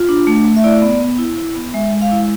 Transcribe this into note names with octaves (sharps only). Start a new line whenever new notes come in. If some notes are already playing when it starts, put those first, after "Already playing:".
Already playing: F4
D4
A3
A3
E5
E4 D5
B3
B3
E4
E4
B3
G#3 E5
G#3
F5
E4